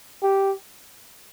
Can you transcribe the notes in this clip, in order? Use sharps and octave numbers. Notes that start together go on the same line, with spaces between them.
G4